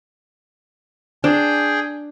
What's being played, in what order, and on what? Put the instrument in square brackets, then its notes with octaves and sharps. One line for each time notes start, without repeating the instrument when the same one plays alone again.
[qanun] D4 [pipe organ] G#4 G5